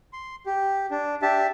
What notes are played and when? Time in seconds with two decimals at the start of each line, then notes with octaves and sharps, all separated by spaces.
0.13 C6
0.46 G4
0.91 D4
1.22 D4 G4 E5 A5